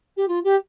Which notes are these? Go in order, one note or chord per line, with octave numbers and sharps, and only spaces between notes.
G4
F4
G4